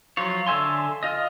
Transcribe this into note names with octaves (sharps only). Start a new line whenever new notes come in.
F3 F#3 F4 C#5
D3 A4 E5 G#5 C6
F4 D#5